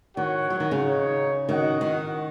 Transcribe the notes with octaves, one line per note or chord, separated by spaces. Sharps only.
D#3 F#4 C#5 F#5
F#3
D#3
C#3
D#4 G#4 C#5
D#3 F#4 D#5 F#5
D#3